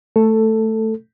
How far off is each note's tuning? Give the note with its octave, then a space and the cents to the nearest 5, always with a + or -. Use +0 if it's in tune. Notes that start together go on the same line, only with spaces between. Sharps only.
A3 +0 A4 +10